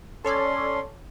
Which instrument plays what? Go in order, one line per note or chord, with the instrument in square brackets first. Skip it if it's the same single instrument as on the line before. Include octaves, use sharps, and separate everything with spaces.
[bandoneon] C#4 C6 [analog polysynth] A4 C#5 D5